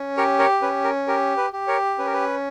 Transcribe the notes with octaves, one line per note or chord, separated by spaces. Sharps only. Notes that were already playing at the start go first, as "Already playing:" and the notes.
Already playing: C#4
G4 A#4 C#5
A#4 C#5
C#4 B4
A#4
G4 A#4
B4
G4
A#4 C#5
C#4 B4
A#4
B4